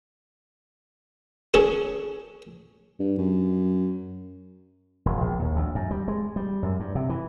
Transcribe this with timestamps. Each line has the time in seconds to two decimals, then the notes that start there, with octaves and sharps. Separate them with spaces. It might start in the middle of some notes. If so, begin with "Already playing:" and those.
1.54 C#4 G#4 A4
3.00 G2
3.18 F#2
5.06 E1
5.21 A#1
5.39 D#2
5.56 D2
5.75 F#2
5.91 G3
6.08 G#3
6.36 G3
6.63 F#2
6.80 G2
6.95 C3
7.09 E3